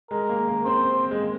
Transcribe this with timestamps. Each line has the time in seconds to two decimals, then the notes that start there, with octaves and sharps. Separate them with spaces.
0.11 G#3 A#4
0.29 A#3
0.48 A#3
0.65 C4 C5
1.11 G#3
1.21 A#3